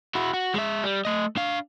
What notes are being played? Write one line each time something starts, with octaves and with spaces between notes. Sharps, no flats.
E4 F#4
F#4
G#3 E5
G3
A3 D#5
D4 F5